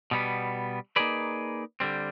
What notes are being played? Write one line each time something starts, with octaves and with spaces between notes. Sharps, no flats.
B2 G3 B3
A#3 D#4 G#4 B4 D5
D3 G3 C4